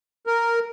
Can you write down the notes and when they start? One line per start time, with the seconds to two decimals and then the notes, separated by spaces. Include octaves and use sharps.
0.27 A#4